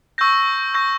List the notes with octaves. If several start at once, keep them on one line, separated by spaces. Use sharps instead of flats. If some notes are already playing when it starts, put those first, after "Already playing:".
C#6 E6 G6 A#6
C#6 E6 G6 A#6